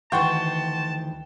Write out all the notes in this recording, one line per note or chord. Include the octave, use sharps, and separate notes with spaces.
D2 D#3 E3 F#5 G5 A5 C6 C#6